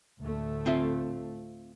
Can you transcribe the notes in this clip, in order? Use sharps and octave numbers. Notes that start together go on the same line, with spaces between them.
D2 A2 A3
C4 F4 E5